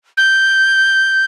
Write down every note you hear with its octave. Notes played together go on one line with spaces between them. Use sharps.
G6